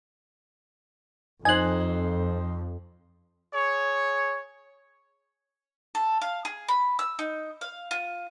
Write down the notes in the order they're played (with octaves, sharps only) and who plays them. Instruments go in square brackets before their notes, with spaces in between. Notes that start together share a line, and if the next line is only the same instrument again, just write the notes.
[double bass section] F2 [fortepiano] D#4 C5 [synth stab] G#5 F#6
[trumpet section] G#4 C#5
[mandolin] A4
F5
G#4
B5
E6
D#4
F5
F4